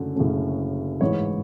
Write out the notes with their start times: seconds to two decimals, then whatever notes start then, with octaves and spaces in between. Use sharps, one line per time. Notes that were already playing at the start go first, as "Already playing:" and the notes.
Already playing: F#1 F#2 D3 A3 C#4
0.16 F#1 F#2 D3 A3 C#4
1.01 A1 G#2 E3 C#5